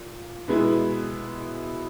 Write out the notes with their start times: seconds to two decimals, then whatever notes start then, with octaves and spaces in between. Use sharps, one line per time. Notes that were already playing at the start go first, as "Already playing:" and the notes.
Already playing: A#2
0.48 B2 G#3 B3 E4